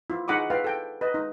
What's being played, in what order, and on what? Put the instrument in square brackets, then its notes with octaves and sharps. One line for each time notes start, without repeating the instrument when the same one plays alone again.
[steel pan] E4 F4
D#4 G#4 F#5 B5 D6 D#6
B4 E5 F5 G5
A4 G5
B4 D#5
D#4